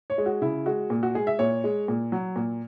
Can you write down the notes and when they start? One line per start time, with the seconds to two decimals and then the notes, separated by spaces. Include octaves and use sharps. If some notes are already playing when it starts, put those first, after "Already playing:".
0.10 C#5
0.18 G#3
0.26 F#4
0.42 C#3 E4
0.66 G#3 F#4
0.90 A#2
1.03 F#4
1.15 G#3 G#4
1.27 E5
1.39 A#2 C#5
1.64 G#3
1.88 A#2
2.12 F#3
2.36 A#2